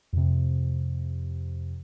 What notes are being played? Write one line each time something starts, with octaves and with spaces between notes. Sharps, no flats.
F2 C3